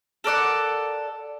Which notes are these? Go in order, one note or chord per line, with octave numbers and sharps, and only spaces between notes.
A4 A#4 D5 F#5